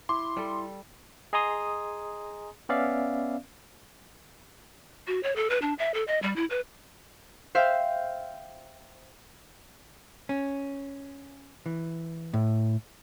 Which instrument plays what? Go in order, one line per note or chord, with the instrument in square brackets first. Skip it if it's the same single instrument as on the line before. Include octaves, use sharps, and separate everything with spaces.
[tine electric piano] E4 [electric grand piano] C6 [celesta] D6
[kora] G3 A4
[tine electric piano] G#4 D#5 G#5 A#5 C6 D#6
B3 C#4 D5 E5 F5
[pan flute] F#4
C#5
A4
B4
D4
E5
A4
D#5
G3
E4
B4
[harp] C5 E5 F5 G5
[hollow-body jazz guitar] C#4
E3
A2